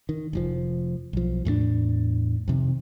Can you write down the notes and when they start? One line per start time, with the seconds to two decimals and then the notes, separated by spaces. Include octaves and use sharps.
0.09 D#3
0.33 F1 A2 F3
1.13 B1 F3
1.45 E2 A2 A3 D4
2.48 F2 C3 D#3